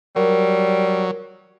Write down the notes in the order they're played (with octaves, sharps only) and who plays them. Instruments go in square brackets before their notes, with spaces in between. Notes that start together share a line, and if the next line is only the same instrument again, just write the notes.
[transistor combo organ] F#3 [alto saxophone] G3 [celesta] A#4